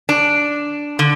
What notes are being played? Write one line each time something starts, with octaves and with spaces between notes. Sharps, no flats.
D4
D3